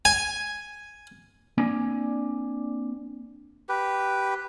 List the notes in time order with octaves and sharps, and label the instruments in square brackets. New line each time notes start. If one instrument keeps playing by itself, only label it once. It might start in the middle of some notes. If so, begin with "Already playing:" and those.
[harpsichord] G#5
[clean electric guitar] A#3 C4 D4 G#5
[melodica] G4 B4